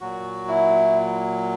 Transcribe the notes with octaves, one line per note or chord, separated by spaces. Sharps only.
A#2 F#3 F#4
E4